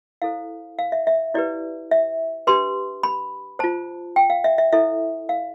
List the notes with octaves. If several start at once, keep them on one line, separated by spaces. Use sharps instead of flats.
E4 A4 C5 F5
F5
E5
E5
E4 G4 B4 D5
E5
D4 G4 B4 C6
B5
F4 C5 A5
G5
F5
E5
E5
E4 A4 C5 E5
F5